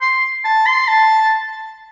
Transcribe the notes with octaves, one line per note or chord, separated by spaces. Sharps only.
C6
A5
C6
A5